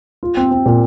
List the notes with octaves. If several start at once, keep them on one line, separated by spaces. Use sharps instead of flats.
F4
C4
C4
A#2